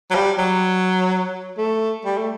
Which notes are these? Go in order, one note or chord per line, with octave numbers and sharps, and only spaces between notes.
F#3
G3
F#3
A3
G3
A3